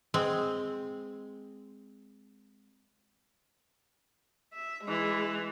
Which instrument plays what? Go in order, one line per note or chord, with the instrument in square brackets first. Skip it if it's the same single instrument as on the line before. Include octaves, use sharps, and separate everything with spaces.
[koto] G#3 C4
[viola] E5
E3 G#3